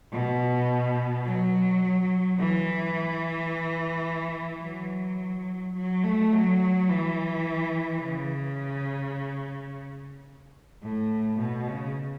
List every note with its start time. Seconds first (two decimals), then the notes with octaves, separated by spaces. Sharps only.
0.12 B2
1.26 F#3
2.38 E3
4.63 F#3
5.76 F#3
6.04 A3
6.33 F#3
6.89 E3
8.02 C#3
10.83 A2
11.39 B2
11.68 C#3